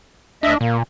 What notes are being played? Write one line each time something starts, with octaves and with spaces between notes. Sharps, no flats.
D2 D4 D#5 E5
A#2 A#3